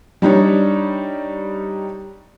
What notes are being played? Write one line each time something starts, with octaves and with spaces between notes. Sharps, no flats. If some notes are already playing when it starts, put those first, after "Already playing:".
G3 D4 D#4 C#5